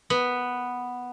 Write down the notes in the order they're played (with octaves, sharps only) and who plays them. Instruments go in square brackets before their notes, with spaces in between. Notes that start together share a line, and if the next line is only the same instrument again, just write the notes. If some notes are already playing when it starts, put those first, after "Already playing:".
[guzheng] B3